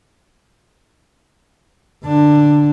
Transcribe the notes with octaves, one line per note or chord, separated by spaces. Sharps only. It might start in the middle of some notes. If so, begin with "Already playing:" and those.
D3 D4